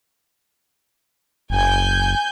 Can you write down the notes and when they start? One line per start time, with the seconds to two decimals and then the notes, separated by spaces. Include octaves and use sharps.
1.50 F#1 G#5 G6